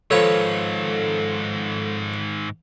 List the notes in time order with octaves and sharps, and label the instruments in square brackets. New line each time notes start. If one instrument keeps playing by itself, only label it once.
[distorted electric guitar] G#2 D#3 [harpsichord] F3 B4 C#5 [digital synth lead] A4